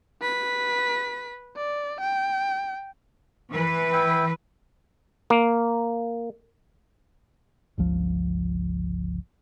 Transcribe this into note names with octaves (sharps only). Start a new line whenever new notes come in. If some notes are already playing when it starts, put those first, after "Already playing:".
B4 B6
D5
G5
E3 B4
E4 G5
A#3
G1 C#2 F3